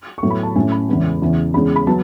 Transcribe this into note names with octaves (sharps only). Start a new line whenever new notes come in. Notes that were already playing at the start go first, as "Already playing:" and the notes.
C#6
A2 F#3 B3
B5
A5
A2 F#3 A3 C#4 G#5
B5
E2 C#3 E3 G#3 B3
E2 C#3 E3
E2 C#3 G#3 B5
B5
F#3 B3 A5